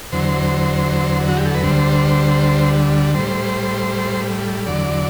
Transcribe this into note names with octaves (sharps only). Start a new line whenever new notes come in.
E2 D3 F#3 C5
F#4
G4
A4
B4
D2 D3 G3 C5
A2 G3 C5
E2 D3 F#3 D5